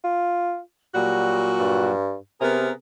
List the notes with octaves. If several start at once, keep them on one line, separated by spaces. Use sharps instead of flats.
F4
A#2 F#3 G3 F#4
G2
C3 B3 G#4 A#4